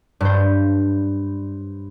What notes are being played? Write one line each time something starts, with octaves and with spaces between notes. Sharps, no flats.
G2 C5